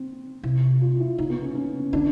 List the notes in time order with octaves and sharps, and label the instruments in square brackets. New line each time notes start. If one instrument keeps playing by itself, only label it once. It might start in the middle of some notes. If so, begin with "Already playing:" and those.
Already playing: [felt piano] C4
[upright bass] C3 [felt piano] E4
[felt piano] F4
E4
[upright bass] C#3 [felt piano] D#4
[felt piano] B3
C#4
C#4
[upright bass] D3 [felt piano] D4